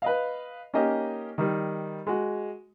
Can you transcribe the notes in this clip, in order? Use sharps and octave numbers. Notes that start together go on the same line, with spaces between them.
B4 D#5 F5
A#3 C#4 D#4 G4 D#5
D#3 G3
G#3 F#4